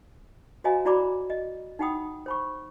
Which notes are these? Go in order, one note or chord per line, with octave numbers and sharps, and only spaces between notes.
F#4 C5 D#5 F5 G#5 A#5
E4 F#4 D5 A#5 B5 D6
D#5
D#4 E4 F#5 G5 B5 D#6
C5 B5 C#6